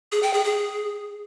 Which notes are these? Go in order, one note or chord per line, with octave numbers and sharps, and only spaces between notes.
G#4
G5
G#4
G#4